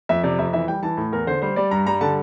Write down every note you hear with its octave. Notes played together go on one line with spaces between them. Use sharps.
F2 E5
C3 D5
F2 E5
E3 E5
G3 G5
E3 A5
A2
E2 A#4
D3 C5
G3 C5
G3 D5
G2 A#5
G3 A#5
D3 A5